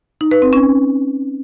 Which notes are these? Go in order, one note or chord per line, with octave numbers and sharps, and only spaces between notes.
D#4
B4
C4
C#4